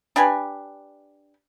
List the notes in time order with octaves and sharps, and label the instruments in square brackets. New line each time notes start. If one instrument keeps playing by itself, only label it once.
[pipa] D4 G4 B4 G#5